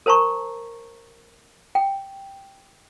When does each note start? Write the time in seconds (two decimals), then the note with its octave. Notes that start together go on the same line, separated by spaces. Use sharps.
0.06 A#4 C5 A5 A#5 C#6
1.75 G5